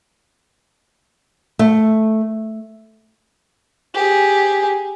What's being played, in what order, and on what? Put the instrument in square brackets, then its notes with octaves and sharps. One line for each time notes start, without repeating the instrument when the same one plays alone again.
[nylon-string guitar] A3
[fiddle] G4 G#4